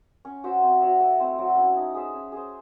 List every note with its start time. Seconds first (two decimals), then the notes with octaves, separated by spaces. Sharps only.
0.25 C#4
0.44 F#4 C5 E5
0.63 C4
0.81 F#4 C#5 E5
1.00 A3
1.19 C4 E4 C5
1.39 F#3
1.57 C#4 E4
1.76 D#4
1.95 G#4 C5 E5
2.14 C#4
2.32 G#4 C5